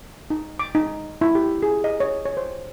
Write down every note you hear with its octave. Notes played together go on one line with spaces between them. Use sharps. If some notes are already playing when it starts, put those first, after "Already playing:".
D#4
D6
D#4
E4
G4
G#4
D#5
C#5
C#5
C5